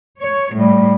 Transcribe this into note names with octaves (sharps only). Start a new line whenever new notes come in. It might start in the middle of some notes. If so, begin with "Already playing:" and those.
C#5
A2 G3